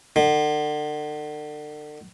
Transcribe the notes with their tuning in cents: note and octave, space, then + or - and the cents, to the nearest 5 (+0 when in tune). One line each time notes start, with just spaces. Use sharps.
D3 +40